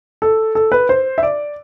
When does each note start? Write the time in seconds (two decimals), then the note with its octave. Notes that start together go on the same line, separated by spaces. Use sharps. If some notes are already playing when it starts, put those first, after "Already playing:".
0.22 A4
0.55 A4
0.72 B4
0.89 C5
1.18 E5
1.23 D5